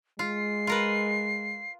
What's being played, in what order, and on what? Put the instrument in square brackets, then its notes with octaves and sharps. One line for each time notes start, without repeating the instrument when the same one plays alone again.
[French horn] G#3 [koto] F4 [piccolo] C7
[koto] F4 A#4 B4